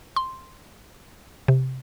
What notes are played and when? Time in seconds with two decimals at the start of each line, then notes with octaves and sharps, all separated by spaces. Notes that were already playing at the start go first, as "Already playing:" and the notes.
0.16 C6
1.48 C3